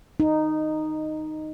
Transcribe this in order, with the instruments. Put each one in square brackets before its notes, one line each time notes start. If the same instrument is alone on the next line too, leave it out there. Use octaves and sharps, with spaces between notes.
[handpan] D#4